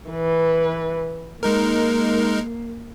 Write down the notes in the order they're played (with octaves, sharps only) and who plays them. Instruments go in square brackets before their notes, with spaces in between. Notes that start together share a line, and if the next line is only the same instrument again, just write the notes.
[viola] E3 B4
[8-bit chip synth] G#3 D#4 A#4 [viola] A#3